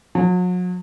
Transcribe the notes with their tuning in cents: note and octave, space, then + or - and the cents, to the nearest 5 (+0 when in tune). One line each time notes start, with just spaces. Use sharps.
F#3 -40